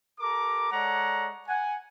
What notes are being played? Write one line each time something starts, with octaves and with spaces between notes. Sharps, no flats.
G4 A4 A#4 A#5 D6
G#3 A4 C#5 D5 F#5 A#5
F#5 G#5